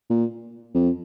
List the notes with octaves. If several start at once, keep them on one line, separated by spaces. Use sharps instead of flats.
A#2
F2